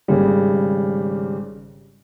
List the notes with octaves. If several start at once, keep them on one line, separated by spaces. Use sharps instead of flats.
G#1 C#3 G3